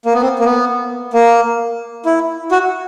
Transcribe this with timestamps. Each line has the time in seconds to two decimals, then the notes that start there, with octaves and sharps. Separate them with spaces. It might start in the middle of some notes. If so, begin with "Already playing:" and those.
0.05 A#3
0.14 B3
0.22 C4
0.39 A#3
0.44 B3
1.13 A#3
2.05 E4
2.51 F#4